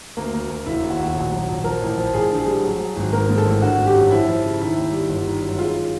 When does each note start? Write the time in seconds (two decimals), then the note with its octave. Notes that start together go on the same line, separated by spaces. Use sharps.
0.17 D2 A#3
0.33 D2
0.49 D2
0.66 E1 E4
0.83 D#2
0.90 F#4
0.99 D#2
1.16 A#1
1.31 F#3
1.49 A#1
1.64 F3 A#4
1.82 A1
1.98 F3
2.14 A1 G#4
2.30 D3
2.38 G#4
2.46 G3
2.63 F#3
2.80 F#3
2.96 G#1
3.12 G#2 A#4
3.29 G#2
3.38 A4
3.45 A1
3.61 D3 F#4
3.78 G#1
3.86 G4
3.94 F#2
4.11 F3 E4
4.27 F3
4.44 C#3
4.60 D#3 E4
4.76 D#2
4.92 G3
5.09 G1
5.26 D#3
5.42 F#2
5.58 G#3 F4